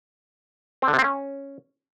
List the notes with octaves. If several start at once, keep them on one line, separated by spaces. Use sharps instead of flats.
C4
D3
C3
C4
C#4